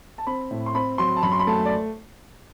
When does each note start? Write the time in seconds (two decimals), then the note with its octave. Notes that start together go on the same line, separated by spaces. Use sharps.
0.18 A5
0.27 C4 B5
0.51 A2
0.66 C6
0.74 C4 B5
0.98 F#3 C6
1.16 A5
1.23 F#2 B5
1.32 C6
1.39 B5
1.47 A3 A5
1.65 D5